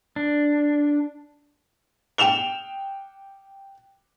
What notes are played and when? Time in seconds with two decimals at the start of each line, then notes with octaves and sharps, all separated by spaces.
0.16 D4
2.18 G5 E7 F7 G7